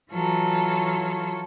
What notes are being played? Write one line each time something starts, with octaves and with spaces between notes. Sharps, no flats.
E3 F#3 F4 A4 C#5